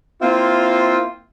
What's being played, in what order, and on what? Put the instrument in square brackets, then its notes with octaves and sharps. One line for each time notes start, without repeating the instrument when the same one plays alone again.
[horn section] A#3 C4 E4 F4